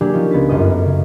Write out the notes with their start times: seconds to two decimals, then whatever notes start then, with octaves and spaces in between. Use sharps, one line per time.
0.01 F#3 A#3 D4 G4 G#4
0.14 F3 C#4 D#4
0.31 C#2 B3 A6 B6
0.49 G1 F#2 D#5 D#6
0.64 F#6
0.85 C#3